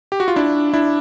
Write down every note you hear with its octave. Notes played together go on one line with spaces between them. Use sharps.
G4
F#4
F4
D4 E4
D4 E4